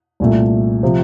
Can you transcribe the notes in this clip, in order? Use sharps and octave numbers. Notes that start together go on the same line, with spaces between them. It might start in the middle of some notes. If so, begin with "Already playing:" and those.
C2 A#2 A3
C3 F3